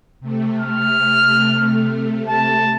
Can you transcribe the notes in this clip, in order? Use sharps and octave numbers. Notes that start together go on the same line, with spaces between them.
C3 A3
F6
A5